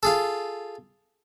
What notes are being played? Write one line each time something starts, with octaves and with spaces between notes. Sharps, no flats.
F4 G#4 A4